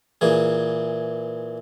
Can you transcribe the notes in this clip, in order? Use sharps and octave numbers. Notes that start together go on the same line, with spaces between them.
A#2 E3 G#4